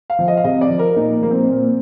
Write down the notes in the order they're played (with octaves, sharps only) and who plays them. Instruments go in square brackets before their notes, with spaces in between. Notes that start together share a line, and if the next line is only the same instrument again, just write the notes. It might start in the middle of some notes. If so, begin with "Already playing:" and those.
[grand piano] F5
F3
D#5
F5
C3 D#5
D5
F3
A#4
A#2 D#4
F3 A#3
C4
A#2